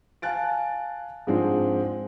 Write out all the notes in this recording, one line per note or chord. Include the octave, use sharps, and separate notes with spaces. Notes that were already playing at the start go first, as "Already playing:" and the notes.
F5 G#5 A5 F#6 A6 D7
G#2 F3 G#3 C4 D4 F4